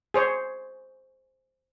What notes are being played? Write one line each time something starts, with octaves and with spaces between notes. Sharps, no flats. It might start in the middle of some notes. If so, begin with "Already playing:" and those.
G#4 C5 C#5